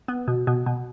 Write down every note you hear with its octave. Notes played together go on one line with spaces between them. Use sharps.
B3
B2
B2
B2